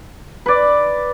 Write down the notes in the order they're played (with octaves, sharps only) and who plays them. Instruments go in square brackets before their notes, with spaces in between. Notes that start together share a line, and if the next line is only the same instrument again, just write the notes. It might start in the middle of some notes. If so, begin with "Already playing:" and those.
[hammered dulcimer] B4 D5